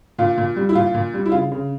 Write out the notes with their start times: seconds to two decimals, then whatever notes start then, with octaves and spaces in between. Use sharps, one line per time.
0.19 A#2 F4
0.38 A#2
0.56 G3
0.69 E4
0.75 A#2 F4
0.94 A#2
1.14 G3
1.26 E4
1.32 C#3 F4
1.51 C#3